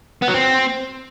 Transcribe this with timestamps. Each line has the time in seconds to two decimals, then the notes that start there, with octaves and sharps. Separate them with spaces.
0.22 B3
0.28 F#3
0.34 C4